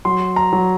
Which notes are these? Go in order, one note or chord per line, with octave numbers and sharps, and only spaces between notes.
F#3 C6
A#5
F#3